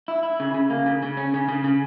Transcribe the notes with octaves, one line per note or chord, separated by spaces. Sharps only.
E4
E4
C#3
C#3
A#3
C#3
C#3
C#4
C#3
C#3
C#3